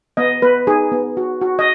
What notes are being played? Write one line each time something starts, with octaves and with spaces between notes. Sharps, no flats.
B3 D#5
B3 B4
D#4 G#4
B3
F#4
F#4
D#5